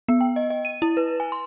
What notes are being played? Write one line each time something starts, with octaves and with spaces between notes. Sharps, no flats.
B3
G5
D#5
D#5
D#7
E4
B4
G#5
C6